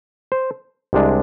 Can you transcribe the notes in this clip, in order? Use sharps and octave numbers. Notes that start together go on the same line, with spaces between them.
C5
C2 C3 G#3 D4